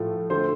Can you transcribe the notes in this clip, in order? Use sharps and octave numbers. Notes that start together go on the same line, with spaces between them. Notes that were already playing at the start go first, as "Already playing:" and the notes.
Already playing: A2 F3 A3
D3 A3 C5